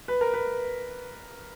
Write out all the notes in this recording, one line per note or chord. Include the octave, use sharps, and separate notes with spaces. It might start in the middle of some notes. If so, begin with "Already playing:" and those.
B4
A#4
B4